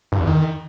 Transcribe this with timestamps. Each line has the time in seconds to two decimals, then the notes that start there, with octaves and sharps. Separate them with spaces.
0.12 G2
0.20 E2
0.27 D#3